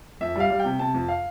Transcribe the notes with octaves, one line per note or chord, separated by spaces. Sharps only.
F2 E5
G3 F5
G3
G5
C3
C3 A5
F2
F5